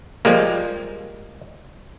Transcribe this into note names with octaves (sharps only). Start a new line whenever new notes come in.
F3 G3 G#3 A#3